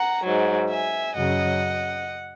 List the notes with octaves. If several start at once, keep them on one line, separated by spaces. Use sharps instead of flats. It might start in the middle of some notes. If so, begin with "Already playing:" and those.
Already playing: F#5 A#5
G#2 F#3
E5 G#5
F#2 C#3 F#3 D#5 F#5